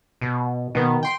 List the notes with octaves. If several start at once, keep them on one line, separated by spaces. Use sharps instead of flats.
B2
B2 D#3 B3
G5 C6